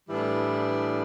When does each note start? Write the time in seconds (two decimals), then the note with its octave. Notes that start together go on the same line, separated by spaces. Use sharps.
0.08 A2 E3 G3 B3 D4